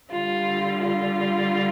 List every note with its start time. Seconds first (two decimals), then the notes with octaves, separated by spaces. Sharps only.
0.11 D3 G3 F4
0.81 F4